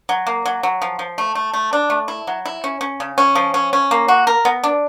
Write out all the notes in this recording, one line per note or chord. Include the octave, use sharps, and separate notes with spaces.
F#3
A#3
F#3
F#3
F3
F3
A3
A3
A3
D4
A3
E4
F#3
E4
C#4
C#4
C#3
C#4
F3
C#4
C#4
A#3
F#4
A#4
B3
D4